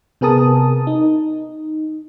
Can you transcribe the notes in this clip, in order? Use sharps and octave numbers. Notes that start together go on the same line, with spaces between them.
C3 B3 G#4 A#4 A5 D#6
D#4